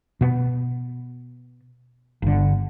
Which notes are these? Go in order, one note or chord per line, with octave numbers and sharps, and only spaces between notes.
B2 B3
G1 D3